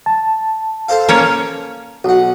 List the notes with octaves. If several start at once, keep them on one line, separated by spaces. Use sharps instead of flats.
A5
A4 C5 F5
A#3 C#4 C#5
B1 F#4 F#5